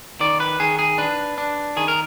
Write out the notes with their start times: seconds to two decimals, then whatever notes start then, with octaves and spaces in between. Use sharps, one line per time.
0.20 D#3 D5
0.40 B4
0.60 D#3 G#4
0.79 G#4
0.98 D4 B4
1.38 D4
1.77 D#3 G#4
1.88 A#4